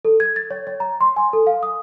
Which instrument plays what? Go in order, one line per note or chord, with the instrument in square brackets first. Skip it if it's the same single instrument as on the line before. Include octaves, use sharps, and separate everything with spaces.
[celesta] A4
G#6
A6
C#5
C#5
A#5
C6
G#5
A4
F5
D#6